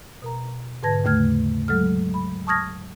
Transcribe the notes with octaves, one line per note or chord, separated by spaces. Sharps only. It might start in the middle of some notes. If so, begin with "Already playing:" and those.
B2 A#4 A#5
G#2 D3 B4 A5 G#6 A#6
D#2 C#3 A3 F6 G#6
F#3 G#3 A4 F6
B5
A5 C#6 D#6 F6 G#6 A#6